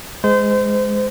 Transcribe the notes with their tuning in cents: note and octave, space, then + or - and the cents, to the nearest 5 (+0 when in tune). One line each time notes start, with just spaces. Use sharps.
G#3 +0 C5 -30